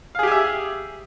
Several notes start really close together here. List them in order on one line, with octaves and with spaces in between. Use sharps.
F5 G#4 G4 G#5 E5